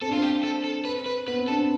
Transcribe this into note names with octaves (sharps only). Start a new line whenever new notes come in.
C4 A4
D4
F4
C4 G4
A4
A4
B4
B4
B3 B4
C4
D4 A4
C4